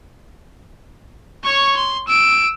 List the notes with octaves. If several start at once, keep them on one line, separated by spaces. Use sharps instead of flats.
C#5 C#6
C6
E6 D7